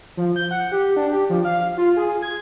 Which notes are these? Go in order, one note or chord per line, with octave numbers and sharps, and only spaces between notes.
F3
G6
F#5
G4
D4
G4
F3
F5
F4
G#4
G#6